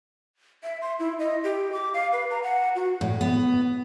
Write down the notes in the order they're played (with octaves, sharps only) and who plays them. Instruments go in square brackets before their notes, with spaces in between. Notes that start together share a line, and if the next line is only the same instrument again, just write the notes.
[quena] E5
C6
E4
D#5
G4
D6
F5
B4
A#5
F#5
F#4
[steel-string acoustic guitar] A2
B3